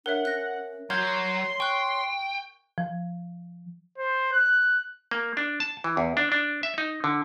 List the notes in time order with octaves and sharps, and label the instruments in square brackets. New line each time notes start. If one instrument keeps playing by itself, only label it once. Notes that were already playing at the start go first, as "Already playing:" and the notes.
[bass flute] D4 [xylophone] A#4 C#5 E5 [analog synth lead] F#5
[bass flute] C#4 [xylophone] F#6 A#6
[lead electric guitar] F#3 [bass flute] C#5 [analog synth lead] C6 [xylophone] F6 G6 G#6
[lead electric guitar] G5 [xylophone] C#6 F#6
[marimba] F3
[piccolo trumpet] C5
F#6
[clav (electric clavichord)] A#3
D4
A5
E3
E2
D4
D4
E5
D#4
D3